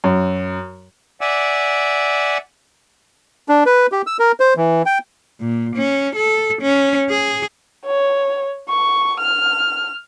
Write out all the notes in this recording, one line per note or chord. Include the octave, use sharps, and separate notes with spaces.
F#2
D5 E5 F#5 G#5 D6 E6
D4
B4
G4
E6
A#4
C5
E3
G5
A#2
C#4
A4
C#4
G#4
C#5
C#6
F6